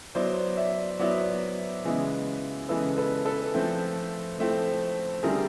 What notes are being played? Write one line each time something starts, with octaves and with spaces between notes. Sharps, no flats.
F#3 B3 E4 C5 D5
D5 E5
F#3 B3 E4 D5 E5
C#3 E3 G#3 B3 E4
C#3 E3 G#3 B3 E4 A4 B4
A4 B4
A4 B4
F3 A3 C4 E4
F3 A3 C4 E4
D3 G3 C4 E4 G#4 A#4